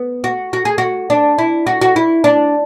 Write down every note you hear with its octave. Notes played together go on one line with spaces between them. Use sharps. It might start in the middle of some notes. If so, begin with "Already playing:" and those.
Already playing: B3
F#4
F#4
G#4
F#4
D4
E4
F#4
F#4
E4
D4